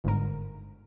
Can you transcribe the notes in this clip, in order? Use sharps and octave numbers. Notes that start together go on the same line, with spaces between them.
G1 G#2 A#4